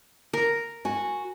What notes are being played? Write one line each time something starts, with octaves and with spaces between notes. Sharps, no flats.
A#4
F#4 G#5